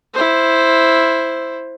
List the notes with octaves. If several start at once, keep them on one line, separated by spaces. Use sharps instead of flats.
E4 C5